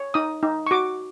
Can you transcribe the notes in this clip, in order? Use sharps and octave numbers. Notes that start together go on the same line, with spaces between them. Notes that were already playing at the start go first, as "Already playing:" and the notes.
Already playing: C#5
D#4 D#6
D#4
C#6
F#4 D6